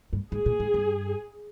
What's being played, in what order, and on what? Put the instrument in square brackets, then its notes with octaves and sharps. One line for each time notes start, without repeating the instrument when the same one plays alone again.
[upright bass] G2
[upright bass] G#2 [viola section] G#4
[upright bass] A#2
G#2
G2